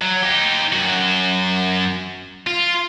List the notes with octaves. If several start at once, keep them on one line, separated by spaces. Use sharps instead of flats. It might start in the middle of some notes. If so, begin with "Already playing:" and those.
F#3
D#4 G4
F#2 F#4
F4